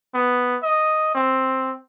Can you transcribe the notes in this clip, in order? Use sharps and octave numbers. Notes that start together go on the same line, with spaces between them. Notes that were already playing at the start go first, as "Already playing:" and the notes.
B3
D#5
C4